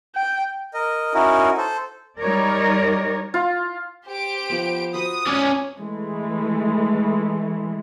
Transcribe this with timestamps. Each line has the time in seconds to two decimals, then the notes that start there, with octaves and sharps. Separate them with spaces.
0.15 G5
0.74 A#4 D#5
1.14 C#4 D#4 E4 F#4 A#4
1.58 A4 C5
2.20 G3 D#4 A#4 C#5 D5
3.34 F4
4.07 G4 C5 D7
4.50 F3 B3
4.94 F#4 C5 B5 D#6
5.27 C#4 C#5 D5 A#5 D6
5.78 E3 G#3 A3